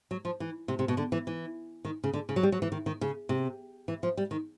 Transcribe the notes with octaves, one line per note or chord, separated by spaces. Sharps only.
F#3
F3
E3
C3
C3
B2
D3
E3
E3
D#3
C#3
D3
C#3
F#3
G3
F#3
E3
D#3
D#3
C#3
C3
E3
F3
G3
D#3